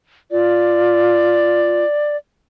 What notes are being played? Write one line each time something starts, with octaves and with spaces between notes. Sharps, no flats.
F4 D5